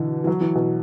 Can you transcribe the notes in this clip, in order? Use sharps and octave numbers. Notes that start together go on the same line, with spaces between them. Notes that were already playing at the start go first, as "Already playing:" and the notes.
Already playing: B2 D3 E3
E3
F#3
E3
B2